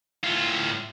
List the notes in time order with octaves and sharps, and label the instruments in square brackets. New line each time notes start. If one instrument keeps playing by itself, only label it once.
[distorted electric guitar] A2 F4